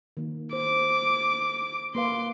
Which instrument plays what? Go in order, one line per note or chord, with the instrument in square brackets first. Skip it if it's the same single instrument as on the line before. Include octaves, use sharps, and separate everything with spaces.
[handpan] D#3 A#3
[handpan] C5 [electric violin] D6
[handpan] A#3 B4 F5 [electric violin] C6 D6